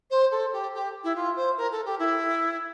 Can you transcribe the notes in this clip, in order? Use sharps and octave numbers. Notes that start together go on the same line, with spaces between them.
C5
A4
G4
G4
E4
F4
C5
A#4
A4
G4
E4